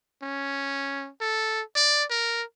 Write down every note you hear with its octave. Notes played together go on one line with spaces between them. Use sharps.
C#4
A4
D5
A#4